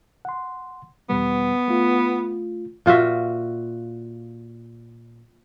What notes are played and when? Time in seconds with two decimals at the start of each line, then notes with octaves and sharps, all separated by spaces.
0.25 F#5 C6
1.09 E2 B2 G3 B3
1.68 A3 F4
2.86 A#2 F4 F#4 E5